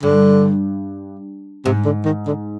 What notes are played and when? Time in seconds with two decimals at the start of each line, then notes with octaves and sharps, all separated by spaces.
0.03 G2 D3
1.65 G#2 C3
1.85 D3
2.05 D#3
2.26 D3